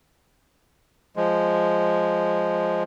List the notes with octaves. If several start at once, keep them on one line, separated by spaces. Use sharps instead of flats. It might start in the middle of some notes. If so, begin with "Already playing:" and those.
F3 G#3